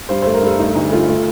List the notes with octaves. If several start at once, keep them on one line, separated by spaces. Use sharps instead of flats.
G2 C5
A3 C5
A#4
G2 A4
A3 D#4
D2 D#4
A3 F4
A3